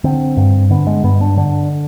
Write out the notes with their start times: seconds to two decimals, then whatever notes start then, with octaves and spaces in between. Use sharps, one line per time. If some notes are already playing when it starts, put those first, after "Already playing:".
0.04 D3 C4
0.37 G2
0.71 D3 B3
0.87 G#3
1.04 G2 B3
1.21 D4
1.37 D3 D4